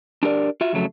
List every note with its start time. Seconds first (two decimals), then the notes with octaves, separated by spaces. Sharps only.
0.23 D4 G4 A#4 D5
0.61 F4 F#4 E5
0.73 F2 C#3 F#3 A3